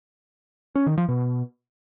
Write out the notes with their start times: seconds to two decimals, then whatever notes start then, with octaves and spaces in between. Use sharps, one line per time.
0.75 C#4
0.86 D#3
0.98 F3
1.09 B2